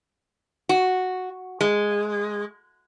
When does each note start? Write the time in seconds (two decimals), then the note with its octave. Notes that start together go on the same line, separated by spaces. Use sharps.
0.69 F#4
1.61 G#3